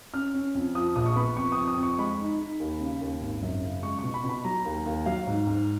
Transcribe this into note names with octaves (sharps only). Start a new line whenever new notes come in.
C#4 F6
C#4
F2
F3 D#6
A#1 D#6
C#6
B3 B5
F2 C#6
D#6
F2
D#6
F2
C#6
G#3 B5
D#4
D#4
D#2
C#3
D#2
G#1
F#2
C#3
G#3 C#6
B2 C#6
B5
B2
B5
F#3 A#5
D#2
D#2
F#3 F5
G#2
G#2